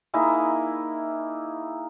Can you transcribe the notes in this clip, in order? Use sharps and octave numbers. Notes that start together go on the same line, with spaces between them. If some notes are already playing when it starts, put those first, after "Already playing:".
A#3 D#4 E4 G#4